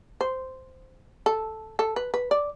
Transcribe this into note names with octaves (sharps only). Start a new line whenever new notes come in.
C5
A4
A4
B4
B4
D5